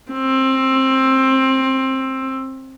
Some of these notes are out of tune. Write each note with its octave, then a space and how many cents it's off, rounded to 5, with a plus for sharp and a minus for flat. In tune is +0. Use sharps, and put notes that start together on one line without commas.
C4 +20